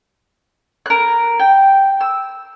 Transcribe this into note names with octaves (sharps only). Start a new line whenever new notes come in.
A#4 F#6
G5
E6